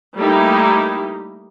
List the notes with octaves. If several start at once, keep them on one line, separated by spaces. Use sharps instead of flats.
G3 A3 A#3 D#4 E4 G4